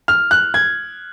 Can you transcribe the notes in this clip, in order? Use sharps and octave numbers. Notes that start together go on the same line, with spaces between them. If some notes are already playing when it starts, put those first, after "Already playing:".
F6
F#6
G#6